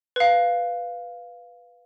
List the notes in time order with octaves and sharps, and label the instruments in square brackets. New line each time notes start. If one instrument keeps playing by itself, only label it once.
[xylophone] B4 F5